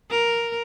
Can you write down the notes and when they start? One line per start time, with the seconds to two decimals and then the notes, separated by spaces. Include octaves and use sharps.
0.10 A#4